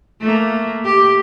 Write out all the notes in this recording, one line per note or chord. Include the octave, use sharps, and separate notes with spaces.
A3 A#3
G4